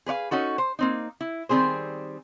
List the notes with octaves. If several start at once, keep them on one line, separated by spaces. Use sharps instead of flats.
G#4 B4 C#5 F5
C#4 D#4 F#4 A4
C5
A#3 C4 D#4
E4
D#3 G3 C4 G#4 C5